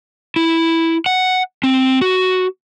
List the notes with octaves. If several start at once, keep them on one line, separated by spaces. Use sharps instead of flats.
E4
F#5
C4
F#4